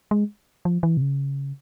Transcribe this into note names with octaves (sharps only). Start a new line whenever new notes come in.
G#3
F3
E3
C3
C#3